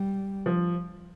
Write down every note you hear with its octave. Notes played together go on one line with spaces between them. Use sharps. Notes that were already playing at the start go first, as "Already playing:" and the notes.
Already playing: G3
F3